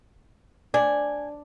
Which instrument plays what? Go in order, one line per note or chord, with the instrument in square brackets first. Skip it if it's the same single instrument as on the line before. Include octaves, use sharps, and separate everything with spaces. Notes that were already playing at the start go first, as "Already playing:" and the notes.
[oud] D4 [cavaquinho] G#5